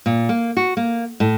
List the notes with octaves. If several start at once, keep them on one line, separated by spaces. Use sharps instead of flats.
A#2
A#3
F#4
A#3
A2